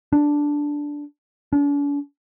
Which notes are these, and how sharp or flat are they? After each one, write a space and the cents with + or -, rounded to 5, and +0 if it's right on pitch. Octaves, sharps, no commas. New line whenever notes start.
D4 -5
D4 -45